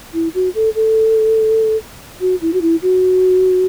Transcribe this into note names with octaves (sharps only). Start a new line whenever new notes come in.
E4
F#4
A4
A4
F#4
E4
F#4
E4
F#4